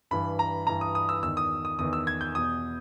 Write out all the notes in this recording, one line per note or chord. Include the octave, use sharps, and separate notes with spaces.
G2 E3 B5
A#5
G2 E3 A#5
D#6
D#6
E6
E2 D#3 E6
D#6
D#6
E2 D#3 D#6
E6
G#6
G6
E2 B2 D#6